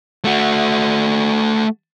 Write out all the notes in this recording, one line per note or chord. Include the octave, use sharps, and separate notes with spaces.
A3 F#4